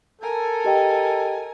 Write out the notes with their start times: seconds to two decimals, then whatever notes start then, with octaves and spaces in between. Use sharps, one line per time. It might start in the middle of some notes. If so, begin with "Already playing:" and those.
0.22 A4 A#4 G#5
0.64 G4 D#5 G5